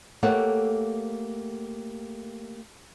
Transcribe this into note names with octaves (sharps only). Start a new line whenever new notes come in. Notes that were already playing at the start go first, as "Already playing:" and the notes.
A3 A#3 G4 A4 C#5 F#5